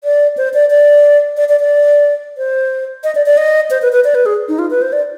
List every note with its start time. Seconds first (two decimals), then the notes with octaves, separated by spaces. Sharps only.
0.04 D5
0.37 C5
0.54 D5
0.70 D5
1.37 D5
1.49 D5
1.60 D5
2.38 C5
3.04 D#5
3.15 D5
3.26 D5
3.37 D#5
3.71 C5
3.82 B4
3.93 B4
4.04 D5
4.15 B4
4.26 G#4
4.48 D#4
4.59 F4
4.70 B4
4.82 C5
4.93 D5